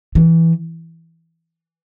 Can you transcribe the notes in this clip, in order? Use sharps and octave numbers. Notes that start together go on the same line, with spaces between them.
E3